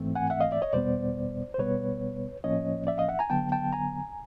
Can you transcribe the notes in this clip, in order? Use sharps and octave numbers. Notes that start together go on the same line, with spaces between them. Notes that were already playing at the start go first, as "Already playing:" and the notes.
Already playing: G#2 E3 A3 C4
F#5 G#5
E5 F#5
D#5 F5
D5 E5
C#5 D#5
E2 B2 G3 B3 C5 D5
C5
B2 G3 B3 B4 C#5
A2 F3 A#3 C#4 C#5 D#5
D5 E5
D#5 F5
E5 F#5
G#5 A#5
D3 F#3 B3 G5 A5
G5 A5
G#5 A#5